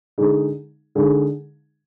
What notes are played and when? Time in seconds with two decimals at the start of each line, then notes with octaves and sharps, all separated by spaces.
0.18 D3 G#3 D#4 G#4
0.95 D3 G#3 D#4 G#4